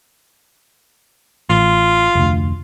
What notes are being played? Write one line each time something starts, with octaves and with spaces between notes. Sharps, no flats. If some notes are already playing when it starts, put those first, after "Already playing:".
A1 F4
F1 D2